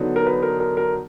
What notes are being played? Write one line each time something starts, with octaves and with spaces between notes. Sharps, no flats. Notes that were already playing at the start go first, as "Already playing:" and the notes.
Already playing: D3 F#3 B3 D#4
A#4
B4
A#4
A#4
A#4